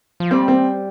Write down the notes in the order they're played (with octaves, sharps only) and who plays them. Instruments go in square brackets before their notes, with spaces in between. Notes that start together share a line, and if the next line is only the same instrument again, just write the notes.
[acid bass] F3
[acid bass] G3 [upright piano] C4
[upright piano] C4